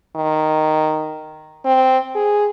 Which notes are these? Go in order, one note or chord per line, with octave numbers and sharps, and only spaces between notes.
D#3
C4
G#4